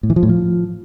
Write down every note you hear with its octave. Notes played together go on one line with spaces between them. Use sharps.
A2
E3
F3
A2
F3